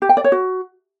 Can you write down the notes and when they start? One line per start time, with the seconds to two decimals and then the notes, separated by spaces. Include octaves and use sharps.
0.02 G4
0.09 G5
0.17 D5
0.24 C#5
0.32 F#4